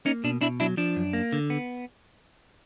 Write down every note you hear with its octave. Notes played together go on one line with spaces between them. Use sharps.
A#3 C#4 D#4
B2 D4
B2 D4 E4
F#3 D4 E4
F3 D4
F#2
A#3
D3
B3